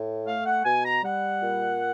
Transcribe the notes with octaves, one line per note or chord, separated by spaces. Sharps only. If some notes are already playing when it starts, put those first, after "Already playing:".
Already playing: A2
A3 F5
F#5
B2 G#5
A#5
G3 F#5
A#2